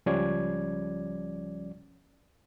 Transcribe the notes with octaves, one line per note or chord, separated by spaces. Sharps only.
C#2 F3 G3 C#4 D5 G#6